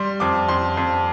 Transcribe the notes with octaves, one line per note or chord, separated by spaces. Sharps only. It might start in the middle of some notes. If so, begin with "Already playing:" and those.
Already playing: G3 C6
F2 D6
F2 C6
F2